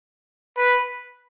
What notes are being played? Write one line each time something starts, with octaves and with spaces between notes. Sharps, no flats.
B4